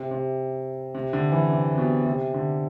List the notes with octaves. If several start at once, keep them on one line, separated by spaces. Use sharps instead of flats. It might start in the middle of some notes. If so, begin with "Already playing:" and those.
Already playing: C3
C3
C3
D3
E3
C3
C3
B2
C3
D3